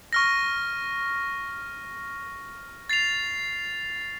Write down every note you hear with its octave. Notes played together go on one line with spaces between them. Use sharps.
C#6 F6 A#6
A6 C7 F7